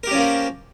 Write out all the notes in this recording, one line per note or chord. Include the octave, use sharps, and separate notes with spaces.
F3 A#3 C#4 G4 A#4